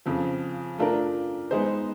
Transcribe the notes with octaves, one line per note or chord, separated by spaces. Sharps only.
F2 C#3 F3
A3 D4 F4 A#4
G#3 B3 D#4 G#4 C5